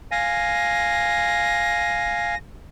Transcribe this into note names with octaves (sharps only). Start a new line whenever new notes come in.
F5 G#5 A#6